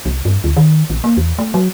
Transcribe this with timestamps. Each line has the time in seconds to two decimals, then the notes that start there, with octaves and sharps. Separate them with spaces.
0.06 C2
0.25 G2
0.44 D2
0.56 D#3
0.90 A#1
1.04 A#3
1.17 E2
1.39 A3
1.54 F#3